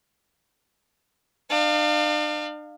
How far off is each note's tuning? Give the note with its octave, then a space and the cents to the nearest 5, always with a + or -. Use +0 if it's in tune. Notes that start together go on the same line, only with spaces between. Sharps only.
D4 +45 F5 +0